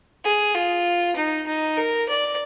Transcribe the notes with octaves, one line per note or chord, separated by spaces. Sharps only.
G#4
F4
D#4
D#4
A#4
D5